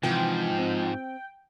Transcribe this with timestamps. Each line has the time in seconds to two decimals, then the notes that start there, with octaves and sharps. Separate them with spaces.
0.03 G#2 C3 E3 F3 G5
0.59 C4